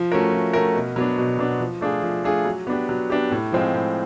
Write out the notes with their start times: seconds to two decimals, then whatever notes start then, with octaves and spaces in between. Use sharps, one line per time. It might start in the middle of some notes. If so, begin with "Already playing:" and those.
Already playing: F3
0.12 A3 C#4 F#4 A#4
0.32 F3
0.53 A3 C#4 F#4 A#4
0.76 B2
0.96 F#3 B3 D4
1.18 B2
1.39 F#3 B3 D4
1.60 F3
1.81 A3 D4 F4 G#4
2.03 F3
2.24 A3 D4 F4 G#4
2.45 F#3
2.67 B3 D4 G4
2.89 F#3
3.10 B3 D4 G4
3.31 A2
3.52 F3 G#3 C4 F4
3.74 A2